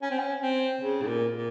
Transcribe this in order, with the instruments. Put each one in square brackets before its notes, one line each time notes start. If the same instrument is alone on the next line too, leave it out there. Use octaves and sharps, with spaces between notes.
[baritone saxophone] C#4
C4
C#4
C4
C#3
G#2
A#2
A#2